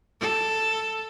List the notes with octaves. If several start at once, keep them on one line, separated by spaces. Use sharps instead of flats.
A4